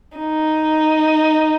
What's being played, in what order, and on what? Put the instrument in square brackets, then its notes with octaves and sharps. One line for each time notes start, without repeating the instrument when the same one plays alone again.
[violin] D#4